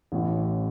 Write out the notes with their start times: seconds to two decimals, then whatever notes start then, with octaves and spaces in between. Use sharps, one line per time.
0.12 A1 A2 E3